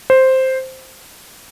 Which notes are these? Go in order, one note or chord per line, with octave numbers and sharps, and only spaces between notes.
C5